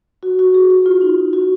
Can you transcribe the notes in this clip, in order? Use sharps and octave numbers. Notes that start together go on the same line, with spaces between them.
F#4
F#4
G#4
F#4
F4
D#4
F#4